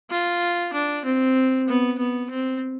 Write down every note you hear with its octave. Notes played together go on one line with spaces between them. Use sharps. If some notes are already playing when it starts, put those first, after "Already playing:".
F4
D4
C4
B3
B3
C4